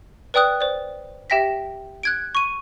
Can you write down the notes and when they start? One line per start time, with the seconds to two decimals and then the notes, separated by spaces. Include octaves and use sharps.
0.34 B4 D5 G5 D#6 F#6
0.61 C5 D5
1.30 G4 E5 G5 A#6 B6
2.03 F#6 G#6 D7
2.35 C#6 D#7